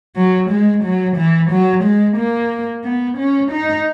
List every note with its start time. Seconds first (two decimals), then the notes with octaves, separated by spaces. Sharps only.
0.16 F#3
0.50 G#3
0.83 F#3
1.17 E3
1.50 F#3
1.83 G#3
2.17 A#3
2.84 B3
3.18 C#4
3.51 D#4